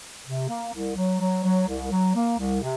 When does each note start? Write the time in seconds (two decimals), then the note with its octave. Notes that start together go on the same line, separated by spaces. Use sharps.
0.24 C3
0.48 A#3
0.72 C2
0.96 F#3
1.19 F#3
1.43 F#3
1.67 C2
1.90 F#3
2.14 A#3
2.38 C2
2.61 C3